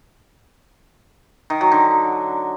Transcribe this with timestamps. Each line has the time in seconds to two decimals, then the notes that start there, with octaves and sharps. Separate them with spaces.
1.50 D#3
1.61 F#3
1.72 D3